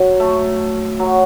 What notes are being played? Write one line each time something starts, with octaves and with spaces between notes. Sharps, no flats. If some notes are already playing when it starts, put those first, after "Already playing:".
Already playing: F#3
A3
F#3